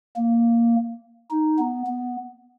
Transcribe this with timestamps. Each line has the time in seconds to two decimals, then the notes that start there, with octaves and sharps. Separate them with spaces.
0.16 A#3
1.31 D#4
1.59 B3
1.87 B3